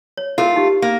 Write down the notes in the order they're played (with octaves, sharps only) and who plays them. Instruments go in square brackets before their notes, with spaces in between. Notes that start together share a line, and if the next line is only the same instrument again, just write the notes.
[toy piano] C#5
[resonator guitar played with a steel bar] A3 F4 [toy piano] E4 G#4 A#4
[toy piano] D#4 G4
[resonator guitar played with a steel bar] A#3